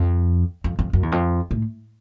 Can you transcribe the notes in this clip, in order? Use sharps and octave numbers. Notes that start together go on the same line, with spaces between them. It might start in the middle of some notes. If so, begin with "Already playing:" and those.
Already playing: F2
F2
F2
F#2
E2
F2
A2